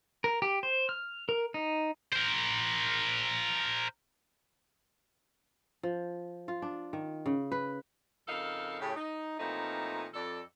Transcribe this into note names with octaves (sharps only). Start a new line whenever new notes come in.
A#4
G4
C5
F6
A#4
D#4
A#4 C5
F3
F4
D4
D#3
C#3
B4
F2 C#3 D#4 A4 A#4 F5
A2 C#3 G4
D#4
A#2 E3 F3 A3 C4 D#4
F2 A4 D5